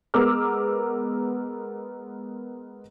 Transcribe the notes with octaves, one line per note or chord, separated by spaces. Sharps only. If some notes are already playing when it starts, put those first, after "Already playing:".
G#3 B3 A#4 D6 E6 F6